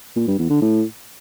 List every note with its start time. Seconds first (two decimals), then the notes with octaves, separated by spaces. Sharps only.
0.16 A#2
0.27 G2
0.39 E2
0.50 D3
0.61 A2